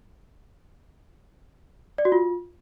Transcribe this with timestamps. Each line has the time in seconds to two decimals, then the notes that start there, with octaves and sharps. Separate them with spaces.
1.98 D5
2.05 F#4
2.12 F4